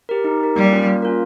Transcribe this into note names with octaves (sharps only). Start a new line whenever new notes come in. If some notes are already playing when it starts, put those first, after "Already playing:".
G4 A#4
D#4
G4 A#4
G3 A#3
C#4 F4 A#4
A#3
C#4 F4 A#4